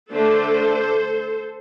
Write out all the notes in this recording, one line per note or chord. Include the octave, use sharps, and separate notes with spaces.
D3 A3 D4 A4 C5